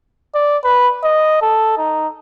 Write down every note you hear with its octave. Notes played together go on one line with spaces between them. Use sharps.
D5
B4
D#5
A4
D#4